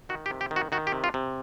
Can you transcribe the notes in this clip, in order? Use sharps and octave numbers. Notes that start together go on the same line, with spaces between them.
D#3 F#4
G4
C3
G4
D#3
F#4
D#3 F#4
G4
C3
F4
C3